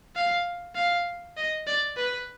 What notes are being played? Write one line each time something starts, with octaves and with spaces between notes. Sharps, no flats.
F5
F5
D#5
D5
B4